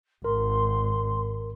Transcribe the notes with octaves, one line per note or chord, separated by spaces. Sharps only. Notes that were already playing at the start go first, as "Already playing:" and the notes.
G#1 A#4 C6